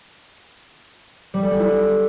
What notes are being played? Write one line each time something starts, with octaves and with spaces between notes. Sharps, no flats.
G3
A4
G3
E4